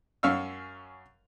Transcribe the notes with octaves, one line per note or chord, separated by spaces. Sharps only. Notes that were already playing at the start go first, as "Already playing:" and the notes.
F#2 C#4 F5 C#6 E6